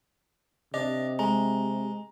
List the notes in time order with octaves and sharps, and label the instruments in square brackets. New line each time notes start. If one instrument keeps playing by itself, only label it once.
[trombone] C3 [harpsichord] D4 [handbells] D#5
[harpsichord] G#3 [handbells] A#5